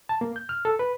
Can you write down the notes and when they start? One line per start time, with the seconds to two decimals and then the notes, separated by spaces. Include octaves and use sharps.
0.09 A5
0.21 A#3
0.36 G6
0.49 F6
0.65 A4
0.79 B4